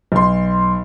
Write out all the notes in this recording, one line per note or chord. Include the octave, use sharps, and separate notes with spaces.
B1 C6